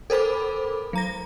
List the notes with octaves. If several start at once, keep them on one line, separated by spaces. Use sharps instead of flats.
A4 A#4 C5 B5 D6
F#3 A#5 A#6